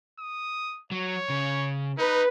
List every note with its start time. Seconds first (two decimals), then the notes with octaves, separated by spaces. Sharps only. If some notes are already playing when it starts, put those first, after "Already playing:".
0.19 D#6
0.92 F#3 C#5
1.30 C#3
1.98 D#4 B4